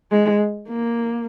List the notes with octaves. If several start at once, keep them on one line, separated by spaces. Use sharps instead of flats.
G#3
A#3